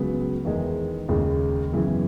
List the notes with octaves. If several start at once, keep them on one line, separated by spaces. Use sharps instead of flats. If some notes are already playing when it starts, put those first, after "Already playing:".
Already playing: C#2 C#3 F#3 B3
E2 D#3 G#3
D#2 C#3 G#3
F#2 C#3 E3 B3